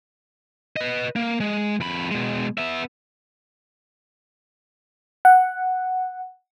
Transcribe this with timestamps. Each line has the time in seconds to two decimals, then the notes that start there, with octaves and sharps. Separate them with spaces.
0.76 B4 D#5
1.16 A#3
1.40 G#3
1.81 F2 B5
2.11 B2 G#3
2.58 B3 E5
5.25 F#5